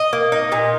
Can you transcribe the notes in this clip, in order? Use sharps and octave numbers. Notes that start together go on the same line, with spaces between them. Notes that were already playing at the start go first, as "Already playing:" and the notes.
Already playing: D#5
A#3
D#4
A#2